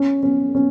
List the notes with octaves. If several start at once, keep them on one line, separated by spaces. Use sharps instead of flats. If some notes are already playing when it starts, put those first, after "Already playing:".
Already playing: C#4
C#4
C#4